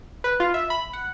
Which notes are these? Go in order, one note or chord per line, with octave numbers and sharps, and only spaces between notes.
B4
F4
E5
B5
F#5